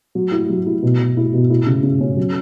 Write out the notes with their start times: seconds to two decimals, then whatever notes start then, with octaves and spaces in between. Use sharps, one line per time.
0.15 F#3
0.32 E4
0.49 F#3
0.66 E4
0.82 B2
1.00 B2
1.17 E4
1.34 B2
1.50 E4
1.67 C#3
1.83 C#3
2.01 C#4
2.17 F#3